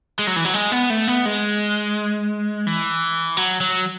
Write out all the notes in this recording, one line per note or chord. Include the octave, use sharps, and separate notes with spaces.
G#3
F#3
E3
F#3
G#3
B3
A3
B3
G#3
E3
F#3
F#3